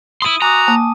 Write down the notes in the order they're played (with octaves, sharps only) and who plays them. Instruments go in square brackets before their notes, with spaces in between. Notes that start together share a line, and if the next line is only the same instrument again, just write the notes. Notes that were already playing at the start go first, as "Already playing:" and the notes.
[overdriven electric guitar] E4 C6 [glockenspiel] D#6 D#7
[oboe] F#4 [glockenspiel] G#5 D6 D#6 [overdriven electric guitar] A#5
[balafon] A#3 [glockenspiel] A5